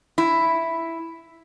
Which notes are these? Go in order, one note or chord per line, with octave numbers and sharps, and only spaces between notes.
E4